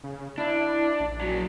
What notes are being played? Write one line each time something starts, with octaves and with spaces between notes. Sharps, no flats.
C#3
D4 E4
A#1
C#3 F#3